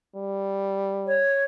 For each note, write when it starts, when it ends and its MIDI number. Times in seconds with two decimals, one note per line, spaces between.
0.16 1.23 55
1.06 1.43 73